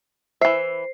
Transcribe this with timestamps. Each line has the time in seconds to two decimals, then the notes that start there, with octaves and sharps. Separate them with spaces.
0.41 E3 C5 E5 C7